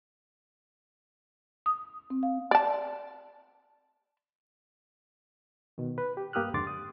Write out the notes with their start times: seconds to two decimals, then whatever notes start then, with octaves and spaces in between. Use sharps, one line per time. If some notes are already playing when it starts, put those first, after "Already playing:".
1.66 D#6
2.10 C4
2.23 F5
2.51 D5 A5
5.78 B2 D#3
5.98 B4
6.17 G4
6.33 G2 A#3 G4 D#6 F6 F#6
6.54 F2 G#2 D3 C6 D6 A6
6.67 D#6